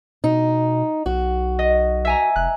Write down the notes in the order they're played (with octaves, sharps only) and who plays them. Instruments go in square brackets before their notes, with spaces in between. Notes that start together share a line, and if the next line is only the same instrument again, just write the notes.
[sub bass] B2 [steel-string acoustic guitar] D#4
[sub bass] B1 [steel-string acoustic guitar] F#4
[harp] D#5
E5 G#5 A#5
[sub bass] F1 [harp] F#6